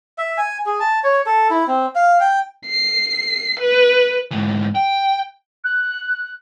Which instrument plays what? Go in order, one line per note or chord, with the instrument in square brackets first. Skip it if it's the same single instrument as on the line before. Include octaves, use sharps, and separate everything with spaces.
[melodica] E5
G#5
G#4
A5
C#5
A4
E4
C4
F5
G5
[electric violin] C7
B4
[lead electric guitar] G#2 E3
G5
[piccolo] F#6